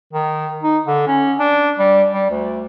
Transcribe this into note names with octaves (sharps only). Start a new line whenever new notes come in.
D#3
D#4
D3
C#4
D4
G3
G3
D2